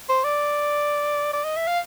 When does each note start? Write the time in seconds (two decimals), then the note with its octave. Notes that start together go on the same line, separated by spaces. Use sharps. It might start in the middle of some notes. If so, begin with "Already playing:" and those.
0.09 C5
0.24 D5
1.33 D5
1.44 D#5
1.56 E5
1.67 F5